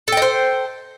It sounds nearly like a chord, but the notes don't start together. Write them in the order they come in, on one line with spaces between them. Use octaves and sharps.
A4 G5 D#5 C5